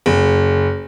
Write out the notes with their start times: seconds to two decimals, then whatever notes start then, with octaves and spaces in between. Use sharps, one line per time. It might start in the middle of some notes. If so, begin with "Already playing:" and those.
0.06 F#1